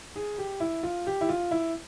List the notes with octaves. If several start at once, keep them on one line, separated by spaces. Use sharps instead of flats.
G#4
G4
E4
F4
G4
E4
F4
E4